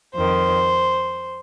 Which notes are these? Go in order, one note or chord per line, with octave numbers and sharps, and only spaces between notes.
F2 D#3 C5